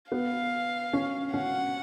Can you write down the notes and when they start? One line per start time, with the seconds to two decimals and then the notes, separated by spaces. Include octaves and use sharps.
0.12 B3 F5
0.93 C#4
1.33 C#4 F#5